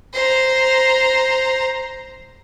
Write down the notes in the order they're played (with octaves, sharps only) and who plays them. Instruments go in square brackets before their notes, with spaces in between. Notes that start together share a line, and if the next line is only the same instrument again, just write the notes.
[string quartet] C5 A#5